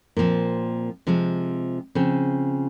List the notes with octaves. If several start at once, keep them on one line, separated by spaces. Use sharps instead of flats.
A#2 F3 C4
C3 F3 G#3
C#3 F3 C4